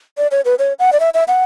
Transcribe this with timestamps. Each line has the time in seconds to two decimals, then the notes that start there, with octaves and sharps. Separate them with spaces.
0.18 D5
0.31 C#5
0.45 B4
0.59 C#5
0.79 F#5
0.93 D5
1.00 E5
1.14 E5
1.28 F#5